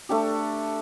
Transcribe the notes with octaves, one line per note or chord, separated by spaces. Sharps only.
A3 D4 G4